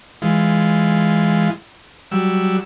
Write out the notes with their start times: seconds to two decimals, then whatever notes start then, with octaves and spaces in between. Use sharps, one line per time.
0.22 E3 G#3 F4
2.11 F#3 G3 E6